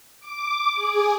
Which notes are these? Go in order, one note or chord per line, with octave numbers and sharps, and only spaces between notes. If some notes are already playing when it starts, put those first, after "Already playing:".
D6
G#4